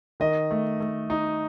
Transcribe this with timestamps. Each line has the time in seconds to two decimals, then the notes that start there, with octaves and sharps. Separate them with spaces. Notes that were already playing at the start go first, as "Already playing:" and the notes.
0.20 D#3 D#5
0.51 A3
0.80 A3
1.10 D#4